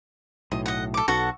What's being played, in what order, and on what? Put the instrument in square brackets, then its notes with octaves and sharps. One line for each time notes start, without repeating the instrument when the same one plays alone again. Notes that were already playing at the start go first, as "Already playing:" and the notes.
[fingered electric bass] B1 A2 [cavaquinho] D#5
[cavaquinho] D#5 F#5
A4 D6
[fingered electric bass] B1 [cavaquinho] F#4 A4 F#5